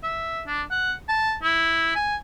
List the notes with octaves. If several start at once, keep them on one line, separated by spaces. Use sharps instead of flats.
E5
D4
F#5
A5
E4
G#5